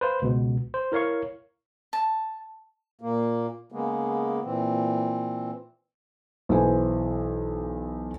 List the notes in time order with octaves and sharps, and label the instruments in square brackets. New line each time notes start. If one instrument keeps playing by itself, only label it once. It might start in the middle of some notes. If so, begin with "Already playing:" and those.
[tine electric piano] B4 C5 F5
C#2 B2
C5
E4 A#4 C#5 F5 C#6
[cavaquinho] A5
[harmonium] A#2 A#3
C#3 G#3 A#3 B3
A#2 E3 C4
[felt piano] B1 E3 B4 C5 G#5